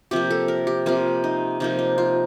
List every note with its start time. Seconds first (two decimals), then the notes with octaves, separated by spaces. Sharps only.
0.11 C3 F3 A#3 G4
0.31 A4
0.48 A#4
0.67 G4
0.86 C3 F3 A#3 F4
1.24 D#4
1.60 C3 F3 A#3 D#4
1.79 D#4
1.98 F4